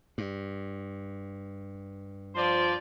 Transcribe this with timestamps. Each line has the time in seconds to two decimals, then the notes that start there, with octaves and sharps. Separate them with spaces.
0.18 G2
2.35 F3 C5 D5